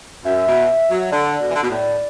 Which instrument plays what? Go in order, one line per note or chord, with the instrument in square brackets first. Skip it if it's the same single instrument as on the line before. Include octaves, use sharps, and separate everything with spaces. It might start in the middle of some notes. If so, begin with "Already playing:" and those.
[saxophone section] F#2 [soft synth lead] E5
[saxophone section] B2
F#3
[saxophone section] D3 [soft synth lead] D5
[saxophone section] B2
E3
D3
B2
A2